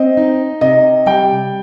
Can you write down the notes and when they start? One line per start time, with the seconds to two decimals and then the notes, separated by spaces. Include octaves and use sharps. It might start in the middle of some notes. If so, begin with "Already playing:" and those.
Already playing: C4 D#5
0.17 D#4
0.61 C3 D#5
1.06 G3 G5